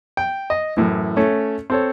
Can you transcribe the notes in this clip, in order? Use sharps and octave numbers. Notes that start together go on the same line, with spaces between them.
G5
D#5
F#2 A2 E3
A3 C#4 C#5
C4 A4 C#5